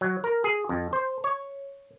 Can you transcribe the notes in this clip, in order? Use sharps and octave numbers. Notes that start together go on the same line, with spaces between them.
F#3
A#4
G#4
F2
C5
C#5